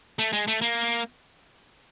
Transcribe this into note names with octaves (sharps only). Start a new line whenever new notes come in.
A3
G#3
A3
A#3